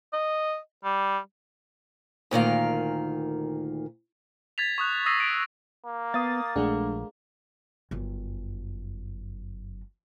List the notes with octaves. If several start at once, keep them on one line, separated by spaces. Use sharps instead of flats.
D#5
G3
D2 A#2 D#3 F5
G#6 A6 B6 F7
C#6 D#6 F#6
D#6 E6 A#6 C7 D#7
D7
A#3
B3 F5 D#6 A6
A#1 G#3 A3 D4 G#4 F#5
G1 F#2